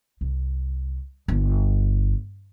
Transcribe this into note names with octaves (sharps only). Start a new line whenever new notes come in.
C2
G1